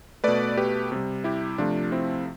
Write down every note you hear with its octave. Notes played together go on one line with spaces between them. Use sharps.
B2 A3 B4 D5
G4 B4
C3 G3
E4 G4
C3 F3 A3 D4 F4
C4 E4